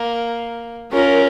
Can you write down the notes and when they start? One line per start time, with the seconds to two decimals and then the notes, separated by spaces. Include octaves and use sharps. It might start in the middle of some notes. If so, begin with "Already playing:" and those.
Already playing: A#3
0.93 C#4 F4 A#4